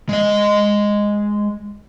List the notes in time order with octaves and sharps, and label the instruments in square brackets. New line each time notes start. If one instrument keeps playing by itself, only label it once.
[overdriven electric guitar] G#3 D#5